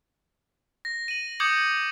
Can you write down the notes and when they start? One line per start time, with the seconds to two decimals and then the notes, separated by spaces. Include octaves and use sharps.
0.85 A#6
1.08 D#7 F#7
1.40 D6 D#6 G6 G#6 C#7 F#7